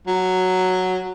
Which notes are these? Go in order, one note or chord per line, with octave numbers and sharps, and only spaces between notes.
F#3